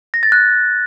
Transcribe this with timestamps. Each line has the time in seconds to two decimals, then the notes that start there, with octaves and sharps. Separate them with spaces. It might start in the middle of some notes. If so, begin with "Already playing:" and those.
0.14 A#6
0.23 A6
0.32 F#6